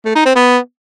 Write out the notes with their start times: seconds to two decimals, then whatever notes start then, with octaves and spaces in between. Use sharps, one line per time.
0.05 A3
0.15 D#4
0.25 C4
0.36 B3